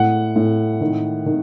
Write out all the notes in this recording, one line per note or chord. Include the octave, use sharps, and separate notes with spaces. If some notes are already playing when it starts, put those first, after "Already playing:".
Already playing: A2 F#5
A2
D#3
D#3